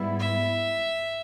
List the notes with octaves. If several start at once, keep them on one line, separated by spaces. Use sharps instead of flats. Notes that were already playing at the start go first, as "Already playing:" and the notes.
Already playing: G#2 G3 B3 E4
E5